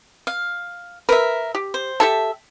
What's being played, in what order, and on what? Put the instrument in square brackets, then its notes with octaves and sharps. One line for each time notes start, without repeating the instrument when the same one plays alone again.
[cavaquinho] F5
[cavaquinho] A#4 E5 [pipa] B4
[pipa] G4
[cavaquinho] C5
[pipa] G4 A4 A5 [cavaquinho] E5